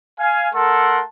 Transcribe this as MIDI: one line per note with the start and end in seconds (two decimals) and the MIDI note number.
0.20 0.48 77
0.20 0.48 80
0.54 1.01 57
0.54 1.01 69
0.54 1.01 70
0.54 1.01 78
0.54 1.01 81
0.54 1.01 84